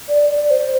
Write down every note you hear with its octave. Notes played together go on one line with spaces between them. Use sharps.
D5
D5
C5